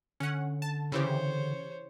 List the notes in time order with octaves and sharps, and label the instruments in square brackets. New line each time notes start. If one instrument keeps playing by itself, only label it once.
[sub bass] D3 [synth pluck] C#4 F#5
[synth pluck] A5
[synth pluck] C#3 E3 G4 [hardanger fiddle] C5 C#5